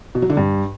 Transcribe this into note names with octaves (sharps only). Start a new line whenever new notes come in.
B2
F#3
D3
G2